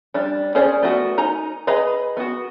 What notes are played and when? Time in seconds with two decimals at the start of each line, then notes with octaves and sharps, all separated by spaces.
0.14 G3 D4
0.55 C#4 G#4 C5 D5
0.82 A3 B3 F#4
1.18 D#4 G#5 A#5
1.67 G#4 B4 D#5 A#5 B5
2.17 B3 F#4